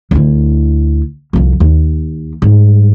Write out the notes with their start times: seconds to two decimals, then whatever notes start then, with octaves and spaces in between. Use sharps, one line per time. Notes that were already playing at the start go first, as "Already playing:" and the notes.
0.11 D2 E4
1.33 C2 F2
1.60 D#2
2.42 G#2 G3